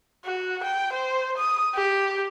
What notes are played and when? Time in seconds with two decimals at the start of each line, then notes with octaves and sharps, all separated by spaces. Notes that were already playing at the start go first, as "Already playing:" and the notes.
0.25 F#4
0.63 G5
0.93 C5
1.37 D#6
1.75 G4